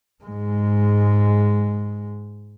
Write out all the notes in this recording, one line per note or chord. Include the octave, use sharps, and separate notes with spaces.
G#2 G#3